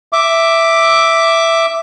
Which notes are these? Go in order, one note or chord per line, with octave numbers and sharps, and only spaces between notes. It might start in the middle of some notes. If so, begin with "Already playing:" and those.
E5 D6